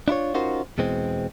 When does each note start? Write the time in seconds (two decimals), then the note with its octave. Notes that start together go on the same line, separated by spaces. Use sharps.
0.08 D4 E4 F4 C#5
0.34 C#4 D#4 F4 F#4 A#4 C5
0.78 E2 B2 E3 G#3 C4